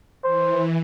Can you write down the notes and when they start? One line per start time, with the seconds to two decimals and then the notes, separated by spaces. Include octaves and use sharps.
0.24 E3 C5